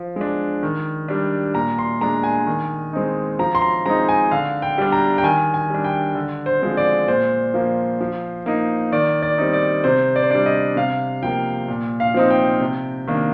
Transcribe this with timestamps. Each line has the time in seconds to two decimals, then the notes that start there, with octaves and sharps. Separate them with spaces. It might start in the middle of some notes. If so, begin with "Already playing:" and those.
Already playing: F3
0.16 G#3 D4
0.63 D#3
1.08 G3 D4
1.54 A#2 A#5
1.79 C6
2.01 G#3 D4 A#5
2.24 G#5
2.47 D#3
2.93 G#3 C4 D#4
3.39 F3 A#5
3.55 C6
3.62 A#5
3.86 G#3 C4 D#4 A#5
4.09 G#5
4.31 D3 F5
4.62 G5
4.78 G3 D4
4.92 A#5
5.18 G5
5.23 D#3 G#5
5.54 G#5
5.70 G3 D4
5.84 G5
6.15 D3
6.46 C5
6.62 F3 G#3 C4
6.77 D5
7.08 A#2 C5
7.54 F3 A#3
8.01 F3
8.46 A#3 D#4
8.92 D#3 D5
9.22 D5
9.38 G3 C4 D#4
9.53 D5
9.84 C3 C5
10.16 D5
10.23 C5
10.31 G3 D4 D5
10.46 D#5
10.76 C3 F5
11.23 F3 A#3 G5
11.68 A#2
12.00 F5
12.14 F3 C4 D#4
12.30 G5
12.61 C3
13.08 D#3 A#3 D4